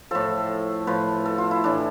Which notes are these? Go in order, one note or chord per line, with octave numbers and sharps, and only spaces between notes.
A2 F3 A4
A2 F3 B4
A4
F4
E4
A2 E3 D4